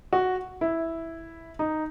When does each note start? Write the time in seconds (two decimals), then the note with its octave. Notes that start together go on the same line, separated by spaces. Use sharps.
0.13 F#4
0.61 E4
1.59 D#4